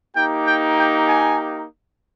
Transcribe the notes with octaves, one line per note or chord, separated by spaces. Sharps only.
A#3 D#4 G4 G5
G5
G5
G#5